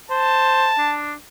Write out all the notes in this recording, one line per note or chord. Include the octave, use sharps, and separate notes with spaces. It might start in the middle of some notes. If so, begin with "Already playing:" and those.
C5 A5
D4